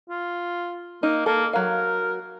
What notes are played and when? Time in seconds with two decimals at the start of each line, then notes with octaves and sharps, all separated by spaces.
0.09 F4
1.03 A#3 D#4
1.26 A#3 A4
1.53 F#3 A#4 F5